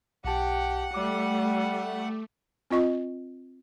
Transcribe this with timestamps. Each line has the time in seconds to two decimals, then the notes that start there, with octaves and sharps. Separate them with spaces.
0.24 B1 G4 F#5 A5
0.94 G3 A3 D6
2.70 C4 F4 D#5 C#6